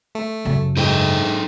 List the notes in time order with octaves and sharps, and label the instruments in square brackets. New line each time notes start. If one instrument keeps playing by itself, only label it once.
[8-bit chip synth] A3
[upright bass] F#2 C#3
[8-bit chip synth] G#2 [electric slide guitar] D#4 A4 G5